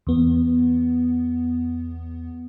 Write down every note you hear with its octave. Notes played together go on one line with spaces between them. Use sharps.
E2 B3